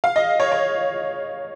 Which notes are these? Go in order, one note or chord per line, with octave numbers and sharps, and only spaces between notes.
F5
D#5
C#5
C#5